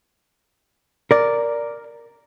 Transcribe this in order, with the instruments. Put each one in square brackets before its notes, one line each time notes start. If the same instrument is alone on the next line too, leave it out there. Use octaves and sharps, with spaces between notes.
[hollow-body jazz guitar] A#4 D5